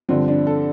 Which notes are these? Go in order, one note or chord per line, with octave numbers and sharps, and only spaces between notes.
G2 D3 F3 C4
D4
A4